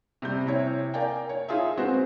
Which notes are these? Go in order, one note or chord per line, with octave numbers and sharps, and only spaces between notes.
C3 G3 G6
C3 E4 C#5
A#4 D5 F5 G5 G#5
C#5
D#4 F4 G#4 E5
G#3 C4 F#4 B4 C5